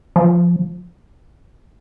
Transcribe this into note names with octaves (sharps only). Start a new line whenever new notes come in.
F3